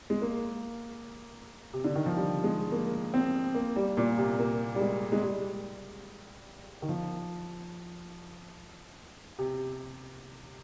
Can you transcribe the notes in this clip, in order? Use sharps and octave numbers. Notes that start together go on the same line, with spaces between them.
G#3
A#3
C3
D3
D#3
F3
G3
G#3
A#3
C4
A#3
G3
A#2
C3
A#3
G3
G#3
G#3
G3
D#3
F3
C3